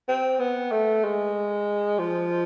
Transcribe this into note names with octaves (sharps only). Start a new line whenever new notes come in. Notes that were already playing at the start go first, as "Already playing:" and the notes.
C4
B3
A3
G#3
F3